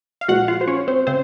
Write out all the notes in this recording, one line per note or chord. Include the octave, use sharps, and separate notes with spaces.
F5
A#2 F3 G#3 F#4 F#5
F4 F5
C5
C#4 C#5
C4 C5
C#3 C4 C5